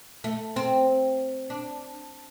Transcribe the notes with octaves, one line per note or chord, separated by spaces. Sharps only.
A3
C4
D4